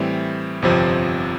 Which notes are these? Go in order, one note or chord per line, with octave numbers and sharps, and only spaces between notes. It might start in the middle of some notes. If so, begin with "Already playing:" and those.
Already playing: A2 E3 G3 C4 E4
G1 F2 C3 F3 C4